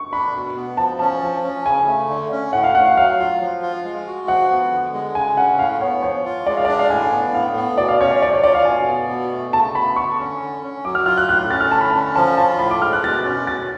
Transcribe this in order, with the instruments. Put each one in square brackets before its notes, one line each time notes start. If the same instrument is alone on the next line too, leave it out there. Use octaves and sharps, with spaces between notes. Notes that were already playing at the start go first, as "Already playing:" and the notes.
Already playing: [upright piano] C#6
[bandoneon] D4 [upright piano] B5
[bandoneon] B2
B3
[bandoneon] F3 [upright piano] A5
[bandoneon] C#4 [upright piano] A5
[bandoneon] F3
C#4
[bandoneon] C#3 [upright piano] G#5
[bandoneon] A3
D3
C#4
[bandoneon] A2 [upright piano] F#5
[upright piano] F5
[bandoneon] A3 [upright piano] F#5
[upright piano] F5
[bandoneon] F#3 [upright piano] F5
[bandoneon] F4
F3
F4
G#3
F#4
[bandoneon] F3 [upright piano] F#5
[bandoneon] B3
D3
G#3
[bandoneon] C#3 [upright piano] G#5
[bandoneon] C#4 [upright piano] F#5
[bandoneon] A2 [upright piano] F5
[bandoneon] B3 [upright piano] C#5
[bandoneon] F3 [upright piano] C#5
[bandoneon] F4
[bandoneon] G#3 [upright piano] D5
[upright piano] F5
D5
[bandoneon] D4 [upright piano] F5
[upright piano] F5
[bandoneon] A2 [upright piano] G#5
[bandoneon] B3
[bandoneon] A2 [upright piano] F5
[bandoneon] B3
[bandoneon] B2 [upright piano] D5
[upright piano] F5
[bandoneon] C#4 [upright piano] C#5
[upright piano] D5
[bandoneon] F3 [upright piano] D5
[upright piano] C#5
[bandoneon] F4 [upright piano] D5
[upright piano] F5
[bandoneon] B2 [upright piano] G#5
[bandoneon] B3
B2
A3
[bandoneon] C#3 [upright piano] A5
[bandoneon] B3 [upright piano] B5
[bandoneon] D3 [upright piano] C#6
[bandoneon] C#4
D3
C#4
[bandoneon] F#3 [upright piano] D6
[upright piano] F6
[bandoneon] F4 [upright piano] F6
[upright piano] F#6
[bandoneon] A2 [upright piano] F#6
[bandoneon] C#4 [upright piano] A6
[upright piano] F6
[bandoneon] D3 [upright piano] A5
[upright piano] B5
A5
[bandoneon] C#4
[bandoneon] F3 [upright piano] A5
[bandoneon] F4 [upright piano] A5
[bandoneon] A2 [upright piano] B5
[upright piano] D6
[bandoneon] G#3 [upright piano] F6
[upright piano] F#6
[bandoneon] B2 [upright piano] A6
[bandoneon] C#4
[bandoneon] B2 [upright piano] A6